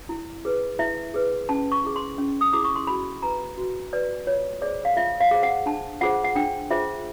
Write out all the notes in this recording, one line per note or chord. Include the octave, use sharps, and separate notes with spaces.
E4
G#4 B4
E4 E5
G#4 B4
C#4 A5
C#6
E4 G#4
C6
C#4
D#6
E4 G#4 D6
C#6
C6
F#4 B5
B4 A#5
F#4
B4 D5
F4 C#5
G#4 C5 D5
F5
F4 E5
F5
G#4 C5
F#5
D4 A5
F4 G#4 C5 F#5
F#5
D4 G5
F4 G#4 C5 E5